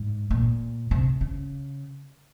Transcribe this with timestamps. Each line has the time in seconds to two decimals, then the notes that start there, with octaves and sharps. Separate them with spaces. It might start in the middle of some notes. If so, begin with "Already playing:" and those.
Already playing: G#2
0.31 A#2
0.91 C3
1.21 C#3